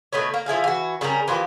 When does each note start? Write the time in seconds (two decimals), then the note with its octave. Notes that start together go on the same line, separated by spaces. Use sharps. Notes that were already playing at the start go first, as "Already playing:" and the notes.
0.13 B2 A3 B4 C#5
0.34 A#3
0.46 F3 E4 G#4 F5
0.64 E3 F#4
1.01 C#3 G3 C#4 A#4
1.28 E3 F3 A#3 G4